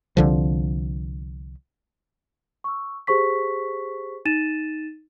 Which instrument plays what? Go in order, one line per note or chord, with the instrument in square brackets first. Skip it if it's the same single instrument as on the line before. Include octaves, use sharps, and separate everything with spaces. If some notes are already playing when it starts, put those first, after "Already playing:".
[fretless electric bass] C2 D3 F3
[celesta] C#6 E6
G4 G#4 C5 C#6 B6
D#4 A6 D#7 E7